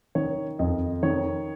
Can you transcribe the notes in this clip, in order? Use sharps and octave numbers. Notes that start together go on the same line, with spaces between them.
D#3 C#5
F2 D#5
D#3 C#5